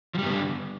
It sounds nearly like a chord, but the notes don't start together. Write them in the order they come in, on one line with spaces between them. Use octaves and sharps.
F3 G3 G2 B3 D3